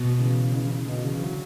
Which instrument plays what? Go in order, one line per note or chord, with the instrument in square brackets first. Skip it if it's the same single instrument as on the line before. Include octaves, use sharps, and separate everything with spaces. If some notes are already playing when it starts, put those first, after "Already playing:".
Already playing: [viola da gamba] B2
[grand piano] C#3 E3
C#3 E3
C#3
B2 D3
C#3 E3
D3 F#3